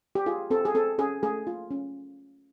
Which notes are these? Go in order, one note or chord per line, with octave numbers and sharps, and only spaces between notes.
G4
F4 G#4
C4 A4
G#4
C4 A4
C#4 G#4
A3 G#4
F4
C#4